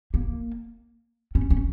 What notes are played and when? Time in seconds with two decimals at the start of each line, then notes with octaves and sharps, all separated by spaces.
0.14 A#3
1.35 C#4
1.50 C#4